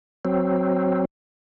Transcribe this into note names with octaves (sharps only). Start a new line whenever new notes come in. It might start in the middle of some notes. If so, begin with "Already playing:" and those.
F#3 C4